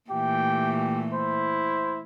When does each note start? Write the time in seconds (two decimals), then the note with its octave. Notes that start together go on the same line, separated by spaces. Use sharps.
0.10 A#2 E3 A3 G4 G5
1.13 E4 C5